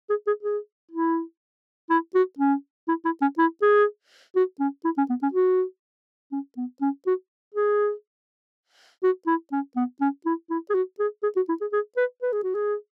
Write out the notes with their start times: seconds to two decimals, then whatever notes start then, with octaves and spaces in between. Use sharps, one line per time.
0.09 G#4
0.27 G#4
0.43 G#4
0.91 E4
1.90 E4
2.15 F#4
2.39 C#4
2.88 E4
3.05 E4
3.21 C#4
3.38 E4
3.62 G#4
4.36 F#4
4.60 C#4
4.84 E4
4.98 C#4
5.10 B3
5.22 C#4
5.33 F#4
6.32 C#4
6.57 B3
6.82 C#4
7.07 F#4
7.55 G#4
9.03 F#4
9.27 E4
9.52 C#4
9.76 B3
10.01 C#4
10.26 E4
10.50 E4
10.70 G#4
10.75 F#4
10.99 G#4
11.23 G#4
11.36 F#4
11.49 E4
11.61 G#4
11.72 G#4
11.97 B4
12.22 B4
12.32 G#4
12.43 F#4
12.55 G#4